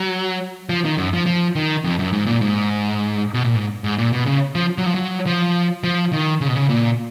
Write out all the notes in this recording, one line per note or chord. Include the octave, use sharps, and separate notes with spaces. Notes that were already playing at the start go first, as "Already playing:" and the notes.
Already playing: F#3
F3
D#3
F#2
F3
F3
D#3
F2
F#2
G#2
A#2
G#2
B2
A#2
G#2
G#2
A#2
B2
C#3
F3
F#3
F3
F#3
F3
F3
D#3
C#3
B2
C#3
A#2